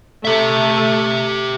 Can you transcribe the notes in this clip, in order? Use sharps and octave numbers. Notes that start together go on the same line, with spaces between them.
A3 G4 E5